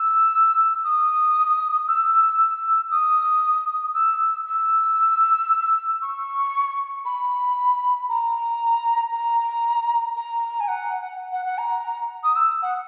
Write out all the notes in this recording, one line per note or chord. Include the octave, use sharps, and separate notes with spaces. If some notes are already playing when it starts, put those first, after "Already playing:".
Already playing: E6
D#6
E6
D#6
E6
E6
C#6
B5
A#5
A#5
A#5
G#5
F#5
F#5
F#5
A#5
D#6
E6
F#5